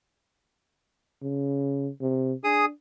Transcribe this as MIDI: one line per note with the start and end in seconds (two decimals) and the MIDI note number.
1.23 1.90 49
2.01 2.33 48
2.44 2.71 62
2.44 2.66 68
2.44 2.66 87